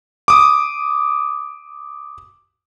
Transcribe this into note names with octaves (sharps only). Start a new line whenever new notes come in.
D6 D#6